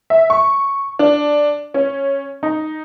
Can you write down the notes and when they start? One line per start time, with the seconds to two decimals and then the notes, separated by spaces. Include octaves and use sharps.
0.10 E5
0.30 C#6
0.99 D4
1.74 C#4
2.43 D#4